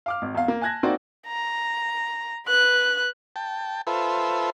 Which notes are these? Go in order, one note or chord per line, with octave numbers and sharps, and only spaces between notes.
F5 D6 F6
G#1
E2 F5
A#3
G#5 A5 F#6 G#6 A#6
A#3 C4 D#4 F#4 D5
A#5
B4 F#6
G5 A5
F4 A4 B4 C5 E5